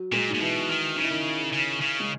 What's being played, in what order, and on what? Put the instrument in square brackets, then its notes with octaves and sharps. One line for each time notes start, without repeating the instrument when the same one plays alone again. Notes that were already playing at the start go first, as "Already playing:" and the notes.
Already playing: [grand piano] F#3 F#4
[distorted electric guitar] A#2 [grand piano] G#3 G#4
[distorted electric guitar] A#2 [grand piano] D#4
[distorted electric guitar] B2 [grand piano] E3 E4
[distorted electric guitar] D#3
[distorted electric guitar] C#3 [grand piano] D#4
[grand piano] E4
D#3 D#4
[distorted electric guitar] C#3
C#3
[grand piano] G#3